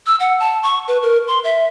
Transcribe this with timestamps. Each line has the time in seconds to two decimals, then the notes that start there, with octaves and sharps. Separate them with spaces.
0.07 E6
0.20 F#5
0.40 A5
0.63 C#6
0.88 B4
1.03 A#4
1.28 C6
1.44 E5